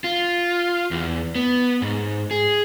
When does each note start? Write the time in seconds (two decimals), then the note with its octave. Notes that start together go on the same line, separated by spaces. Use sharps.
0.04 F4
0.91 E2
1.35 B3
1.82 G#2
2.31 G#4